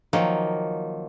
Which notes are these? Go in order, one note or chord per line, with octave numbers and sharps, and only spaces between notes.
D#3 F3 F#3 A#3